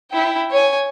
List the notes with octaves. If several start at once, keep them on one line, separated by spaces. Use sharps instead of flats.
E4 G5
C#5 G#5